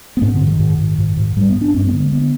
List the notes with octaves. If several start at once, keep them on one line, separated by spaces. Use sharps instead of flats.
B3
G#2 C4
D3
G#2
D#3
G#2
G#2
G#2
G#2
G#2 G3
B3
G#2
D4
G2 C4
B3
D3
G#3
D3 B3